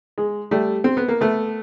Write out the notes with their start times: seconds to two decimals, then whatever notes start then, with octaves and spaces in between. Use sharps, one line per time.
0.18 G#3
0.51 G3 A3
0.84 C4
0.97 B3
1.08 A#3
1.21 A3 B3